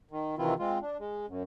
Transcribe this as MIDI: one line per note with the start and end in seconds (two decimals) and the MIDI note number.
0.11 0.35 51
0.38 0.54 48
0.38 0.54 51
0.38 0.54 52
0.38 0.54 60
0.38 0.54 64
0.38 0.54 65
0.59 0.79 56
0.59 0.79 60
0.59 0.79 65
0.82 0.97 62
0.99 1.26 56
1.28 1.43 42